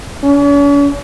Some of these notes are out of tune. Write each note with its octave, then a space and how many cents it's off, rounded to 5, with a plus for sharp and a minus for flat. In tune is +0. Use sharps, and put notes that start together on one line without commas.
C#4 +45